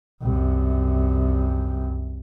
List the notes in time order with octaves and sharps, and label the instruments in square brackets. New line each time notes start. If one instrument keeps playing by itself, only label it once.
[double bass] C2 F#2